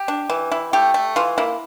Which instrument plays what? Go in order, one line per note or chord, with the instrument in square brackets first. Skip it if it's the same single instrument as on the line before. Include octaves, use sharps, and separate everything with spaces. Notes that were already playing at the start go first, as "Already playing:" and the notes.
Already playing: [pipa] G4
D4
E3
E4
A3 G4
A3
E3 F4
A#3 E4